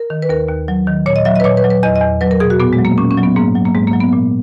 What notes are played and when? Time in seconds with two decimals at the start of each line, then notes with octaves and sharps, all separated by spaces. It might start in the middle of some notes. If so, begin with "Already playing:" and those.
Already playing: A#4
0.10 D#3
0.22 B4
0.29 D#2 A#4
0.49 D#2
0.68 F#3
0.87 D#3
1.06 A#2 C#5
1.16 D#5
1.25 F#3 E5
1.36 D#5
1.40 B4
1.44 A#2 C#5
1.57 B4
1.64 F#3
1.70 B4
1.83 E2 D#5
1.96 D#5
2.02 E2
2.21 F#3 B4
2.31 A#4
2.40 B2 G#4
2.50 F#4
2.60 A#2 B3
2.73 G#3
2.79 F#3
2.85 A#3
2.98 A#2 C#4
3.11 C#4
3.17 F#3
3.23 B3
3.36 G#2 A#3
3.55 F#3
3.66 A#3
3.74 G#2 G#3
3.87 A#3
3.93 F#3
4.00 B3
4.13 A#2